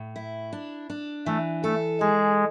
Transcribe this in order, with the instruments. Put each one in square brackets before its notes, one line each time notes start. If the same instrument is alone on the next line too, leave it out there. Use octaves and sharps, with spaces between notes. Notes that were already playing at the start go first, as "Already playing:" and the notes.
Already playing: [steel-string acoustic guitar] A2
E4
D4
D4
[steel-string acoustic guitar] E3 [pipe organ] A3
[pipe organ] A3 [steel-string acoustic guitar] A4
[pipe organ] G#3 [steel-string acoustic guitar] G#4